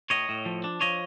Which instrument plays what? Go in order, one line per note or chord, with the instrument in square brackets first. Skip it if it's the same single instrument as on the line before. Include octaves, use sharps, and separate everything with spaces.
[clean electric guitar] A2 C#5 D#5
A2
F3
D4
F3 C#5 D#5